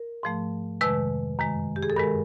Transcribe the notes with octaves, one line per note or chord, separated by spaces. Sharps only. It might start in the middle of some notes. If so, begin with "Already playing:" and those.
Already playing: A#4
G#2 F3 A3
F2 C3 D#3 G#3 B4
F#2 D#3 G#3
G4
G#4
A4
G2 D#3 G#3 A#4